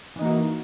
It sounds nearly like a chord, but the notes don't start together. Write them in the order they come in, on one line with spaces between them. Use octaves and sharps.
E3 D#4 A#3 F#4